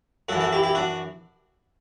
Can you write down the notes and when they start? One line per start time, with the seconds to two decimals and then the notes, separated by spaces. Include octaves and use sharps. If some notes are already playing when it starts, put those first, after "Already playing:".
0.29 F#2 F#4 A4
0.33 E3
0.40 F#4 A4
0.52 E4 G4
0.63 E4 G4
0.75 D4 F#4